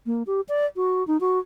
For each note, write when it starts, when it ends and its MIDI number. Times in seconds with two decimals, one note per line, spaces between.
0.06 0.23 58
0.27 0.41 67
0.49 0.66 74
0.76 1.06 66
1.07 1.20 63
1.21 1.39 66